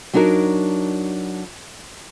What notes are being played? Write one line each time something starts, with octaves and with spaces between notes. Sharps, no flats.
F#3 D4 D#4 F#4 A#4